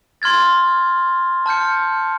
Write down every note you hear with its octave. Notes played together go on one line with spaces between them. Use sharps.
C6 F6 G#6 A6
A5 F6 G6 C#7